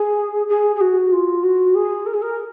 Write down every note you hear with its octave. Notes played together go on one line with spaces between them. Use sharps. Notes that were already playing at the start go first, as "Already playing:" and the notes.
Already playing: G#4
G#4
G#4
F#4
F4
F#4
G#4
A#4
G#4
A#4